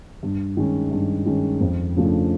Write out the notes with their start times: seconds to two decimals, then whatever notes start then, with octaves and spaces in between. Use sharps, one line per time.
0.23 G2
0.57 D#3 G#3 C#4
0.92 G2
1.26 D#3 G#3 C#4
1.61 F2
1.96 C#3 F3 A3 D4